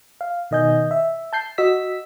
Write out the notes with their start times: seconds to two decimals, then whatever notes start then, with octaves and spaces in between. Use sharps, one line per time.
0.21 F5
0.51 B2 D#3 D#5 G#5 G6
0.91 E5
1.33 A5 G6 C7
1.58 F#4 D#5 E6 B6